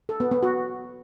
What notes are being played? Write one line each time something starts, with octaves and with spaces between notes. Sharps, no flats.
A4
B3
B3
F#4